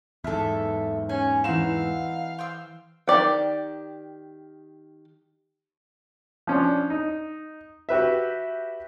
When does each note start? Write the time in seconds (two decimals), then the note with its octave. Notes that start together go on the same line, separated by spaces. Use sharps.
0.24 E2 G#2 A4 E5
1.09 C#4 G#5
1.44 E3 C4 D#4 F#4 F5 E7
2.39 C5 G5 E6
3.08 D#3 G4 D5 G5
6.47 F3 C#4 D4
6.90 D#4
7.89 F#4 G4 B4 E5